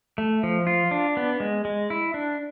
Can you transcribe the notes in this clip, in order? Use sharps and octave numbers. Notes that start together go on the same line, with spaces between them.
A3
F3
F4
D4
B3
G#3
G#3
E4
D4